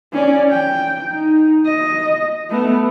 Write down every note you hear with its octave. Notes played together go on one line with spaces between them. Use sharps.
C#4 D5
G5
D#4
D#5
A3 B3